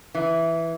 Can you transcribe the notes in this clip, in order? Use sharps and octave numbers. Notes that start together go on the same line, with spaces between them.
E3